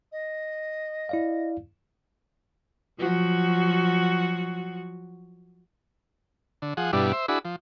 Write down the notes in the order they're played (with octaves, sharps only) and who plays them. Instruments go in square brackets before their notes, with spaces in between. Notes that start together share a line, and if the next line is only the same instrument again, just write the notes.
[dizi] D#5
[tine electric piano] E4 D5 F5
[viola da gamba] F3 F#3 F#4
[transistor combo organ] D3
F3 G#4 F#5
G2 B2 G3 D4 E4
C5 E5
D4 E4 F#4 G#4 B5
F3